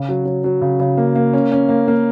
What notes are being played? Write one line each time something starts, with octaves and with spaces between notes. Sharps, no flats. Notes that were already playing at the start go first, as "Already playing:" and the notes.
Already playing: C#3
F#3
F#3
F#3
C#3
C#3
A#3
A#3
C#4
C#4
A#3
A#3